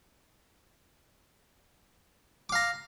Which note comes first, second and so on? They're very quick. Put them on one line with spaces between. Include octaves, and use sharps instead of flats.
D6 F5 A#5